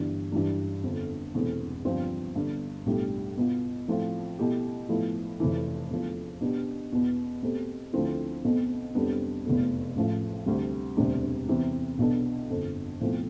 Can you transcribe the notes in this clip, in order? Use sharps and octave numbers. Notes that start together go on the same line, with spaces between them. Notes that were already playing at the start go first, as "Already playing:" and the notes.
Already playing: G1 G2 E3 G3 D4
G2 E3 G3 D4
G1 F2 D3
E1 E2 C3 E3 A3
G1 G2 F3 C4 F4
G1 G2 D3
B1 A2 G3 D4
B2 B3 F4
A2 F3 A3 C4 F4
B2 A3 E4 G4
A2 F3 B3 E4
F1 F2 E3
E2 D3 F3 A3
B2 B3 D4 G4
E2 B2 B3
B2 A3 C4 G4
D2 D3 F3 C4 E4
B1 B2 A3 C4
F2 C3 G3 B3 D4
F1 E2 B2 A3
A1 A2 F3 A3
D2 C3 G3
E1 D2 C3 G3 D4
E2 C3 E3
B1 B2 B3 D4 A4
G1 F2 D3
B1 A2 F3 C4